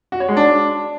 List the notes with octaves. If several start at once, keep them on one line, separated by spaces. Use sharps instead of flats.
F#4
C#5
G#3
D4